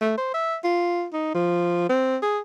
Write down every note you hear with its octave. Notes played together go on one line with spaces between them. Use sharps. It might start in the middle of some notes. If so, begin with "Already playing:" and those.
A3
C5
E5
F4
D#4
F3
C4
G#4